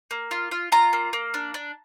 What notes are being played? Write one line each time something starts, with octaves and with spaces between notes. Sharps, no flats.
A#3
F4
F4
F4 A#5
A#3
A#3
D4
D4